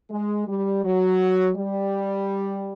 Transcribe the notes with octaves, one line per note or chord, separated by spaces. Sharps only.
G#3
G3
F#3
G3